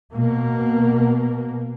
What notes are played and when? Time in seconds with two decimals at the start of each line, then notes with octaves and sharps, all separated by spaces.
0.14 B2 A#3